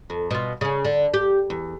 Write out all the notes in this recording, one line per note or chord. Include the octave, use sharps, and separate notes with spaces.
F2
B2 F4
C#3 C#4
D3
G4
E2